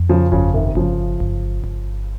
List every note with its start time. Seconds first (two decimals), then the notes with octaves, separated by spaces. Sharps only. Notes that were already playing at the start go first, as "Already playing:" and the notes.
Already playing: F2
0.09 C#3 F3
0.32 G1 C#3 F3
0.54 C3 D#3
0.75 G1 C#3 F3
1.20 G1
1.64 G1